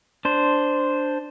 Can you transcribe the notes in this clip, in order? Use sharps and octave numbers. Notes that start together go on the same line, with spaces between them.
D4 C5